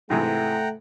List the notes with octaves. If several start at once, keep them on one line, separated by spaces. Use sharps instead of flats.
G#2 C3 E3 A3 F#5 G5 A#5